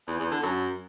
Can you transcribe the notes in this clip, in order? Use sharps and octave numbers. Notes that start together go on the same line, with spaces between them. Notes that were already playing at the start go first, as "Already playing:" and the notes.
E2
E2
D3
F#2